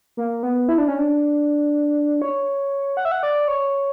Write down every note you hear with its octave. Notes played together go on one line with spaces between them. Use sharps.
A#3
B3
E4
D4
C#4
D4
C#5
F#5
E5
F#5
D5
C#5